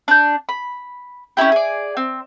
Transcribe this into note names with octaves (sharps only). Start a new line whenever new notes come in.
D4 G6
B5
C#4 D#4 E4 G4
G#4 D5
C4